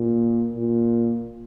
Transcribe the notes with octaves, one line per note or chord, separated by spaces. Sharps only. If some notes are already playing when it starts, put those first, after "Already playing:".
Already playing: A#2
A#2